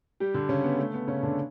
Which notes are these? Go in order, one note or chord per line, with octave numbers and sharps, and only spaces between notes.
G3 G4
D3 D4
C#3 C#4
B3
A3
B3
C#3 C#4
D3 D4